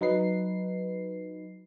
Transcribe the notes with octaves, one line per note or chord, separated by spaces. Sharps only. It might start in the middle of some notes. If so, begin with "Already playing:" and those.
F#3 D#4 B4 C7